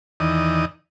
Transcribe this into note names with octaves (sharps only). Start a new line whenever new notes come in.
E2 D#3 E3 D#4 D5 D#6